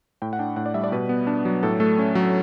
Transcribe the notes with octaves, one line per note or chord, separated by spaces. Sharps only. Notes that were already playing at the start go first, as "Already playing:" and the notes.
A2 G5
F#5
D4 G5
A2 F#5
D5
G3 E5
D5
B2 B4
B3
D4
F#3
A2 A4
A3 A4
C#4
F#3